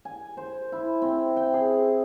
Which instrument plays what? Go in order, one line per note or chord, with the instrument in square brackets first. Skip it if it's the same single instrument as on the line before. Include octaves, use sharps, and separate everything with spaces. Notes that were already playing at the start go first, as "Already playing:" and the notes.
[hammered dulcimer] G#5
C5
E4
C4
G5
G#4